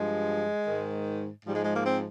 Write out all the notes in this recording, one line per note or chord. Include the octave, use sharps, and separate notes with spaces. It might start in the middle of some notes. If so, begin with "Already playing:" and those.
Already playing: G2 F3 G#3
G#2 D#3
G#2 F3 G3
G#3
G#3
A#3
C4